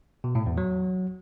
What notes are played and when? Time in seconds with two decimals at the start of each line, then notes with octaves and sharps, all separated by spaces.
0.24 B2
0.35 A2
0.46 E2
0.57 F#3